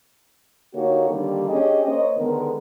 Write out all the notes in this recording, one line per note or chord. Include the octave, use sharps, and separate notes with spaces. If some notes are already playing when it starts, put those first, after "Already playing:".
D3 A#3 D#4 F#4 G4 C#5
D3 D#3 G3 A#3 D4 G4
C#4 D4 G4 G#4 D#5
A#3 C5 C#5 D#5
D3 D#3 G#3 B3 A#4